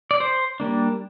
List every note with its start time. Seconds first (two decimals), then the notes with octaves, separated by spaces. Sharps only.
0.11 D5
0.20 C5
0.60 G3 A#3 D4